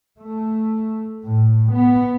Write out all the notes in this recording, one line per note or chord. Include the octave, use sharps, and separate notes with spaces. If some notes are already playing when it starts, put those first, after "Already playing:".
A3
A2
B3